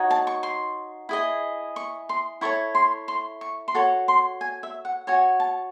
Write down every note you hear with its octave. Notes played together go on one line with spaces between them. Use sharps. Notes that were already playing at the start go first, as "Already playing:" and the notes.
Already playing: D#4 F#4 C#5
A5
C#6
C6
E4 G#4 D#5
C#6
C6
E4 A4 C#5 C#6
C6
C6
C#6
C6
F#4 A4 C#5 C#6
C6
G#5
E5
F#5
F#4 C#5 G#5
A5